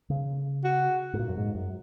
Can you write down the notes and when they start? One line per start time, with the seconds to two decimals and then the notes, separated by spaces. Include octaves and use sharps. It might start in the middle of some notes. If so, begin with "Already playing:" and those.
0.10 C#3
0.64 F#4
1.14 G#2
1.19 A#2
1.29 F#2
1.37 G#2
1.55 F#2